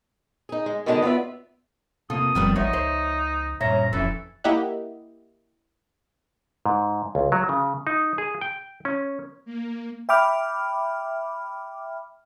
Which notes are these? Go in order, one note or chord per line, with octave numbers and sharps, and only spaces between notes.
D#4 G#4
G#3
B2 D3 D#3 G#3 D4 D#4
B3 F4 A#4 D5 E5
C3 A#3 C4 F4 A4 D#6
D#1 F2 D#3 G3 B3 C4
A1 E2 F3 D#4 C#5 E5
C#2 C5
G2 A#2 C#4 C5 E5 A#5
E1 F2 E3 C#4 A4 E5
A#3 E4 G4 D#5 E5 F#5
G#2
C#2
F#3
C#3
D#4
G#4
G5
C#4
A#3
E5 G5 B5 D6 F6